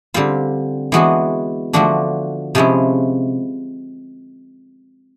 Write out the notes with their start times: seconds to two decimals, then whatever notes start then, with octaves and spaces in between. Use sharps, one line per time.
0.14 D3 G3 C4 F4
0.92 E3 G#3 B3 D4 F#4
1.73 D3 F3 A3 D4 F#4
2.55 C3 F3 G#3 C#4 E4